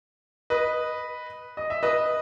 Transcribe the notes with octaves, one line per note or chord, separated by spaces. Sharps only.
B4 D#5
D#5
E5
B4 D#5